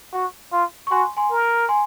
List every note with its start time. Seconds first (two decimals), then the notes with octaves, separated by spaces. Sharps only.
0.13 F#4
0.52 F4
0.87 C#6
0.91 F#4 G#5 C6
1.17 G#5 C6
1.31 A#4
1.69 G#5 C6